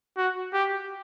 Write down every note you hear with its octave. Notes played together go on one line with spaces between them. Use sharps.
F#4
G4